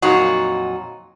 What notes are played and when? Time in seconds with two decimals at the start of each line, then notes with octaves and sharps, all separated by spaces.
0.02 F2 A#2 F#3 D#4 F#4